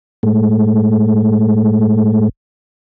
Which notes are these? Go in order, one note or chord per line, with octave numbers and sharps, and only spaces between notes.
A2 G#3 A3